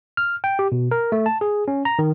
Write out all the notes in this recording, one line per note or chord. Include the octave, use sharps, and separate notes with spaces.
F6
G5
G4
B2
A#4
A3
A5
G#4
C#4
A#5
D#3